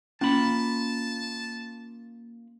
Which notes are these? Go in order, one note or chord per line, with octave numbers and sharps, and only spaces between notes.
A#3 C#4 F4 A5 B5